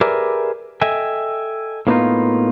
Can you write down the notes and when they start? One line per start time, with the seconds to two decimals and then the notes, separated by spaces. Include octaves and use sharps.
0.01 G4 G#4 A#4 B4 D5 E5
0.82 A4 D#5 E5 G5 G#5
1.87 A2 A#3 B3 C#4 D#4 F4